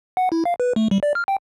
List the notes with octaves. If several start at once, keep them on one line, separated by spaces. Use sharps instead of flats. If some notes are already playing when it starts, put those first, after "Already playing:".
F#5
E4
F5
B4
A3
G3
D5
F6
G5